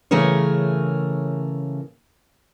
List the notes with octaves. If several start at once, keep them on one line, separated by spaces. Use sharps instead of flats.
C#3 E3 A3 G#4 A#4 C#5